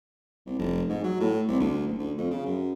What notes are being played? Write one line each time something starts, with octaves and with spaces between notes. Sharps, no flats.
C2
F1
G#2
F#3
A2
C2
D2
F#1
D2
F2
C#3
F#2